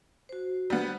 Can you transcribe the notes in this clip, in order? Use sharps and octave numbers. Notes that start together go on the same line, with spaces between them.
F#4 C5
G3 B3